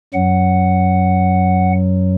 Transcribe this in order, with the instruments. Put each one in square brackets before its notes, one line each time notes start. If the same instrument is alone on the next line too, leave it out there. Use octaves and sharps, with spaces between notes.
[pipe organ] F#2 F#3 F#5